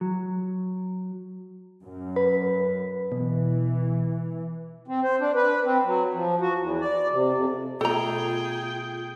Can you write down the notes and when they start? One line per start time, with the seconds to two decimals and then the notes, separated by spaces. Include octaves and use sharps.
0.01 F#3
1.83 F#2
2.16 B4
3.12 B2 E3
4.88 C4
5.03 C5
5.20 D4
5.35 B4
5.64 C4
5.84 F#3
6.14 F3
6.41 F#4
6.58 E2
6.81 D5
7.12 C3
7.32 F2
7.81 B2 A3 F4 G#4 A4 G5 A#5